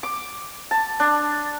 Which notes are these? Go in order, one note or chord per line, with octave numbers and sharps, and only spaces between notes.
D6
A5
D4